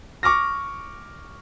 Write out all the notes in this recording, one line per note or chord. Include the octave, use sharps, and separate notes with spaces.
C#6 D6 F6 A#6